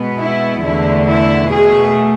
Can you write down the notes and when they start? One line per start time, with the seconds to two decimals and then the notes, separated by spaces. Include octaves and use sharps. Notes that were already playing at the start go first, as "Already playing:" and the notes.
Already playing: B2 G#3 B3
0.19 E4
0.63 E2 D3 A3 E4
1.07 E4
1.49 B2 A3 G#4